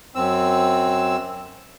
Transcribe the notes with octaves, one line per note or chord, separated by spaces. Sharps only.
F#2 C4 E6